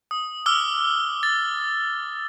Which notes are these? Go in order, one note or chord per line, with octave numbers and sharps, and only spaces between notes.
D#6
D6 E6 F6 G7
A6